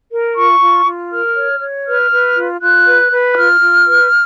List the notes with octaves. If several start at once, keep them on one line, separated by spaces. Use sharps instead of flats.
A#4
F4 C#6
F4
F4
A#4 F6
C#5
C#5
B4 F6
B4
F4
F4 F#6
B4
B4
F#6
F4 F6
F4
B4